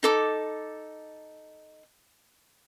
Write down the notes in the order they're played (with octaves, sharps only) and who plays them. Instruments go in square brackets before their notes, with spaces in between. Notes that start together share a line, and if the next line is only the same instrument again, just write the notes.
[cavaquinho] D#4 A4 D6